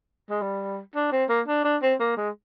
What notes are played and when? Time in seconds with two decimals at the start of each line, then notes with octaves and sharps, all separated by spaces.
0.30 G#3
0.42 G3
0.95 D4
1.12 C4
1.29 A#3
1.48 D4
1.65 D4
1.82 C4
2.00 A#3
2.17 G#3